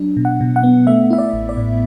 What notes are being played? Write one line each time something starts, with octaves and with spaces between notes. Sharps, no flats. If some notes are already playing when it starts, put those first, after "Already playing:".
Already playing: F#3 D4
B2
F#5
B2
F#5
B3
A3 E5
E4 E5
D5
A1
D5
A2